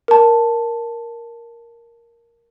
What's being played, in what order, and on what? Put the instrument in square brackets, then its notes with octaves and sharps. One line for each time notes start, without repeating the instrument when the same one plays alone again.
[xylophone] A#4 A5